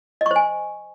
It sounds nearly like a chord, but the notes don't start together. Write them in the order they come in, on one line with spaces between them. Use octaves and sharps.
D#5 C#6 C5 G#5